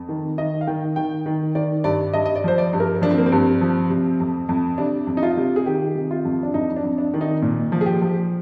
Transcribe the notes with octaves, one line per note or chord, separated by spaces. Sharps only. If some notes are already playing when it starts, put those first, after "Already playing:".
Already playing: F2
D#3
D#3 D#5
F5
D#3 G5
D#3 G5
D#3
D#3 D5
G2 D5
G2 D#5
D#5
D5
F3 C5
D5
G2
A#4
F3 D4
C4
A#3
C4
G2
F3
C3
F2
F2
C3 D4
F2
D#4
F4
C3
G#4
D#3 G4
C3
F4
F2
D4
F2 D#4
D4
F2
D4
D#3
D#4
A#2
F3
G#4
G4
F3